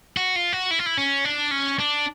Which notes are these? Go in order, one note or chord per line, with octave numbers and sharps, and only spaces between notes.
F#4
F4
F#4
E4
F4
E4
C#4
D4
C#4
D4